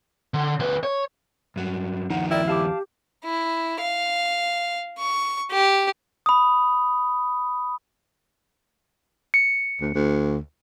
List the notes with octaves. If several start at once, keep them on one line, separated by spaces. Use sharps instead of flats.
D3
D2 B4
C#5
G2 F#3
D#2 F3 D#4 F#5
E4 A#4 D5 G5
G4 F5 A5 D6
E4
F5
C#6
G4
B5 D#6
C#7
D2
D2